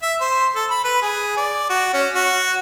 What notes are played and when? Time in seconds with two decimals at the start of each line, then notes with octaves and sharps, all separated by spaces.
0.02 E5
0.21 C5
0.55 A4
0.70 B5
0.84 B4
1.02 G#4
1.37 D5
1.69 F#4
1.94 C#4
2.15 F#4